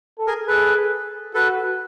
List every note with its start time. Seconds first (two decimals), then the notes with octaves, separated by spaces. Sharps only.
0.19 A4
0.27 G#4 A#4
0.48 G#4 A4 B4
1.34 F#4 A4 B4